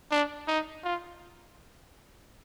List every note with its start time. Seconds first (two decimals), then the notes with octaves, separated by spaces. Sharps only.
0.11 D4
0.48 D#4
0.84 F4